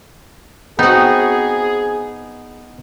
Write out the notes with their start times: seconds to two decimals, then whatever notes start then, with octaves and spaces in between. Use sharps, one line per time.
0.79 B3 C4 D#4 F#4 G#4